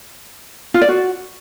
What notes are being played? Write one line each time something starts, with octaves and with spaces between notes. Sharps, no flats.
F4
D5
F#4